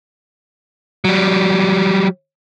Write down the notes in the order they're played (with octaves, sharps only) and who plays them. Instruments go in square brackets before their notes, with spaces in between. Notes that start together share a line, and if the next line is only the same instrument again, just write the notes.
[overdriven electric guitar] F#3 G3